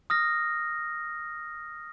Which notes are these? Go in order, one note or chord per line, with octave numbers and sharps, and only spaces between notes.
D#6 F6 A#6